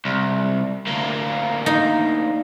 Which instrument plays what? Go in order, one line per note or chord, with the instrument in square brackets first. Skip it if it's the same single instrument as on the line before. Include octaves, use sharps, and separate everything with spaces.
[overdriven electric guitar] C2
D2 A#3
[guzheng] D#4